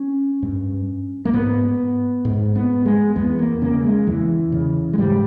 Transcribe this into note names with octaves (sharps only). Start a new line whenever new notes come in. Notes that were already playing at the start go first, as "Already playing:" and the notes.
Already playing: C#4
G2
A#3
G#2 B3
G#2
B3
G#3
E2 B3
A#3
C#3 A#3
G#3
E2 E3
C#3
G#3
G#2 G3